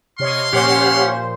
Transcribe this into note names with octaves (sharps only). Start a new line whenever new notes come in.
C3 C#5 D#5 F5 C6
A#2 F3 C#4 G4 C5 C#5 F#5